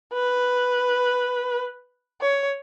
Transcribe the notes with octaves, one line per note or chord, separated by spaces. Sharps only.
B4
C#5